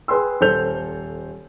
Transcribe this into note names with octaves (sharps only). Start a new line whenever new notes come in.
G#4 B4 G5 C6 E6
D#1 A4 C5 G6 F7